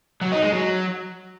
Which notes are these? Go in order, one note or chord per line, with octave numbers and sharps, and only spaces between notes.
F#3
D#4
G#3
F#3